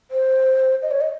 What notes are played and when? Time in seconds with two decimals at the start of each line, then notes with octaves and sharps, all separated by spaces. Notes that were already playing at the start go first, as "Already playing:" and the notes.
0.11 C5
0.82 D#5
0.91 C#5
1.01 D#5